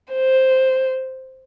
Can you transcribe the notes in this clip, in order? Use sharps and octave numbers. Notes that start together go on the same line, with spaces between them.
C5